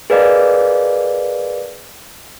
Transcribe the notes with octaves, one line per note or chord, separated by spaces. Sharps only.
G#4 A#4 B4 D5 D#5 F5